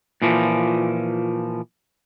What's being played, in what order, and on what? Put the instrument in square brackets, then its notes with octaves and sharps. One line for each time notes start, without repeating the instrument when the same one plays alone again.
[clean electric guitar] A#2 E3 F3